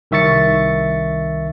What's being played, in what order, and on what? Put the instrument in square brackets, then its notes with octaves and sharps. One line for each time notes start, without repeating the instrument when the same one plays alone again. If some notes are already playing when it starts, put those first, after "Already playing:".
[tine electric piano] C2 D#3 E5 C#6 A6 C#7